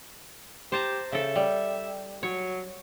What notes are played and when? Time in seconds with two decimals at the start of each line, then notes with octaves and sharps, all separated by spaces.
0.72 G4 C5 A5 A#5
1.12 C#3 A4 E5
1.36 G3
2.23 F#3 C#5